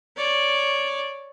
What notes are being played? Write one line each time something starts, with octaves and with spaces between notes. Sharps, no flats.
C#5 D5